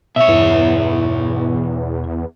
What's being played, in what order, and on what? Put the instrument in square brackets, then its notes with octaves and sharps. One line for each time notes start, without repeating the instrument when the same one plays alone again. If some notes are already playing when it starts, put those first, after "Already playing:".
[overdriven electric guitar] B2 C#5 [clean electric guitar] E5
[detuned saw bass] E2 [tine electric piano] G2 E4